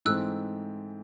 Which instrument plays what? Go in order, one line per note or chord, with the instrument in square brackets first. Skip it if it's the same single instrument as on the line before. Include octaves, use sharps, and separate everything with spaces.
[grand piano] G#2 E3 A3 C4 [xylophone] E6 F#6